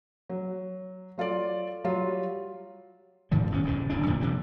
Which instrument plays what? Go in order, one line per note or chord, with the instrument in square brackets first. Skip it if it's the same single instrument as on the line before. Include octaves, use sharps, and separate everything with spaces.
[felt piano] F#3
F#3 F4 A4 D5
F#3 G3 F4
[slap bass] G#2 D#3 F3 G3
B1 E2 G2 C#4
D#1 F2 G#2 C#3
D1 E2 G2 D4
F2 A#2 D3 F3
C3 F3 G3